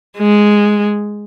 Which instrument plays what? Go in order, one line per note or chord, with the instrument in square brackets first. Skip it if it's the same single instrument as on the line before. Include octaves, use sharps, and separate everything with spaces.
[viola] G#3